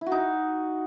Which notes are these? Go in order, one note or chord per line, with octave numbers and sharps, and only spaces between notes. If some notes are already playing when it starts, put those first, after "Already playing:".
E4
F#4
D#4